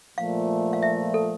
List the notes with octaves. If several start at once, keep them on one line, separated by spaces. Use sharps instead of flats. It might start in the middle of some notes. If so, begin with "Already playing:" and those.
A#2 F3 A3 F5
F5
E5
A4